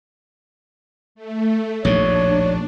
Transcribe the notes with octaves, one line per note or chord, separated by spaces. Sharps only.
A3
A#1 D#2 A2 D4 C#5